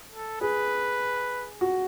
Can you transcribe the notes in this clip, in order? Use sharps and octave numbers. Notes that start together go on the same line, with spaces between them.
A4
G#4 B4
F#4